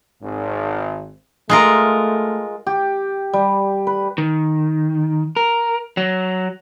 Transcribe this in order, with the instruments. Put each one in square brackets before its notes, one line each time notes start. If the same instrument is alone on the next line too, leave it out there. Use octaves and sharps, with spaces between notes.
[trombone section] G#1
[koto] G#3 F4 A#4 [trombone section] A3
[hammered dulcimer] G4
G3
B4
[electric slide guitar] D#3
A#4
F#3